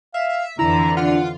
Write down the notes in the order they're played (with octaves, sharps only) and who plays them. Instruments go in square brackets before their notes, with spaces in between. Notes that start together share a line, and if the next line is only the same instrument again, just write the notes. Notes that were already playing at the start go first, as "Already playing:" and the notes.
[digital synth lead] E5 [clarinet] F5
[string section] F2 D3 E3 [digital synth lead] E4 [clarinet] A#5
[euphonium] D4 [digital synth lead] F4 [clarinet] F#5